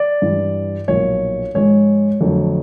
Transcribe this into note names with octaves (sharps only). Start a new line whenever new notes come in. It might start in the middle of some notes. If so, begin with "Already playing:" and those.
Already playing: D5
G2 E3 G3
B1 A#2 F3 C#5
G#2 F3 G#3 C#5
F2 D3 F#3 A3